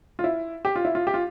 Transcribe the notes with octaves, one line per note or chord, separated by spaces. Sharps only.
F4
E4
G4
F4
E4
F4
G4
F4